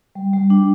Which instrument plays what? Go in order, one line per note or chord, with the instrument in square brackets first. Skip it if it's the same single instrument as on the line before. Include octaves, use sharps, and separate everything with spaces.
[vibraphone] G3
G3
D4